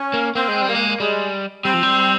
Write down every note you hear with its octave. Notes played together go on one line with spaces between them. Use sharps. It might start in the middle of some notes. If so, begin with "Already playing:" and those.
Already playing: C#4
A#3
A#3 C4
G#3
G3
A#3
G#3
G3 G#3
G3 C4
F3
G3